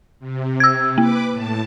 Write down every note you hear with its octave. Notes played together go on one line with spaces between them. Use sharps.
C3
E6 G#6
A#3 B4 D6
A2 A5